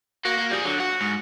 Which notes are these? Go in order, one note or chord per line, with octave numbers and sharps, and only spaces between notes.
A#3 F#4
A#3
F3 G3 G#4
D3 F#3
F#4 F#5
G#2